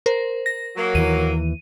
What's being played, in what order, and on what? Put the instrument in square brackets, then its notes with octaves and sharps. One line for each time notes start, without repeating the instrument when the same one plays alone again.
[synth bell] A#4 C5
A#6
[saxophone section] F#3 A#3
[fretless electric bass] D#2 E3 [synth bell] D#7